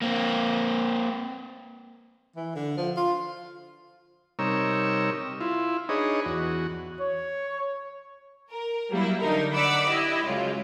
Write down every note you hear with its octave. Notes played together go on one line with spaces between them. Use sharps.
A#3 C4
E3
D3
F3
F4
C3 G3 D#4 A#4 C#5 E6
E4 F4
D4 D#4 G#4 B4 C#5 D#5
E2 F#4
C#5
A#4
F#3 G3 A#3 E4
D3 D#4 A#4
D5 F#5 B5 D6 E6
E4 G4 D#5
C#2 F#2 G#3 F4